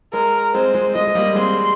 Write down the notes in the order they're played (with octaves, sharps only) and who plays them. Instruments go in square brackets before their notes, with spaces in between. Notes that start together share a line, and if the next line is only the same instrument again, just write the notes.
[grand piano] G#3 [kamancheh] A#4
[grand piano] G#3 C4 [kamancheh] C5
[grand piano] G#3
[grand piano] G#3 [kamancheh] D#5
[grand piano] G#3
G3 A#3
[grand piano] G#3 C4 [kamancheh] C6